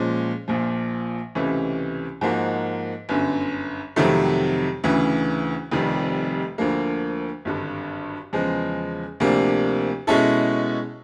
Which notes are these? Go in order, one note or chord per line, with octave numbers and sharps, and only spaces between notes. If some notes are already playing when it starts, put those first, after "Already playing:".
Already playing: A#2 F3 G#3 C#4
A#1 A#2 F3
C#2 C3 E3 A3 C#4
G#2 F3 A#3 D#4 F#4
G1 F#2 D3
F2 C3 D#3 F#3 A3
D2 C#3 E3
F1 F2 C3 D#3 G3
D2 D3 F3 A#3
G#1 G2 D3
E2 C#3 F3 G#3
D2 C3 F3 A#3 D4
B2 G#3 C#4 E4 A4